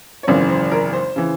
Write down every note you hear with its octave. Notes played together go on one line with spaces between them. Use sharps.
C#5
G#1 F#2 C#3 E3 C5
C5
A#4
C5
C#3 E3